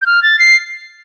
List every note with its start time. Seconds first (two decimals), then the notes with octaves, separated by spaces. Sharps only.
0.02 G6
0.06 F6
0.23 A6
0.39 C7